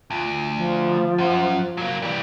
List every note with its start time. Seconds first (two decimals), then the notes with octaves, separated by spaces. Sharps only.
0.10 D2 F4
0.57 F3
1.18 F#2
1.77 F#3 A#3
2.02 E3 G3